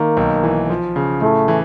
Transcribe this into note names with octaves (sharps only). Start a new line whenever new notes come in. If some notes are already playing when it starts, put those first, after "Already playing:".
Already playing: D#3 A#3
B1
E3
F3
C#3
A2 A3
E3